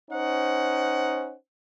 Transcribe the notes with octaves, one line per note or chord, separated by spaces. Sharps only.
C#4 D#4 C5 F#5